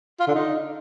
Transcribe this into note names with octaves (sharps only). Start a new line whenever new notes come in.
F4
D3
D#4